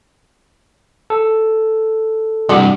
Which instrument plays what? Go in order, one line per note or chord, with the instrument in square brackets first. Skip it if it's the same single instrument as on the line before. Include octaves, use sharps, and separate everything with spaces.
[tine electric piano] A4
[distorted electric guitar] C2 G2 [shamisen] G3 F#4 F#5